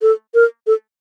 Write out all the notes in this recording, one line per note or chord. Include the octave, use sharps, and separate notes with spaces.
A4
A#4
A4